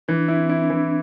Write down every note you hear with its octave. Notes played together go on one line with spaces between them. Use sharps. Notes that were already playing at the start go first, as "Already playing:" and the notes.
E3 D4
E4
C4
E4
D4
E3